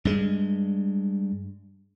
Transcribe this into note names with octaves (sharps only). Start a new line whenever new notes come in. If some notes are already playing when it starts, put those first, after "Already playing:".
G2 G#3